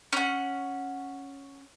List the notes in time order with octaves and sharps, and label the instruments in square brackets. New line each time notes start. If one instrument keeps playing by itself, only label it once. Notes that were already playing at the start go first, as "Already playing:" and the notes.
[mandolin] C#4 F#5